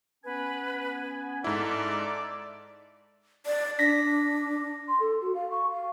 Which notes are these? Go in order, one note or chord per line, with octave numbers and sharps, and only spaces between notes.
B3 C#4 B4 G#5
G#2 G#3 D#4 E4 A4 D5 D6
D5
D4 A#6 B6
C6
A4
F#4
F5
C#6
F5